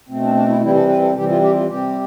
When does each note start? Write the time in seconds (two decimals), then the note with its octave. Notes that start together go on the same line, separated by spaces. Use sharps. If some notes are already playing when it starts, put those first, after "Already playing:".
0.09 B2 A3 C4
0.22 D4
0.35 D4
0.48 E4
0.62 C3 E3 G3 C4 E4
0.75 A4
0.88 B4
1.02 A4
1.15 C3 E3 G3 C4 G4
1.28 F4
1.42 G4
1.55 F4
1.68 C3 G3 C4 G4